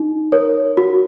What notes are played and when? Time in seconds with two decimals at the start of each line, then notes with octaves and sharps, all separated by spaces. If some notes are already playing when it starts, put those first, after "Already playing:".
Already playing: D#4
0.32 A#4 C#5
0.77 F#4